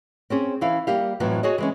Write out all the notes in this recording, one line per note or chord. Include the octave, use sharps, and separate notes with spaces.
C4 C#4 G#4
E3 C#4 E4 F5
G3 A#3 G4 F5
F2 A2 E3 F#3 B3
F#4 G#4 C#5 D#5
E3 G#3 C#4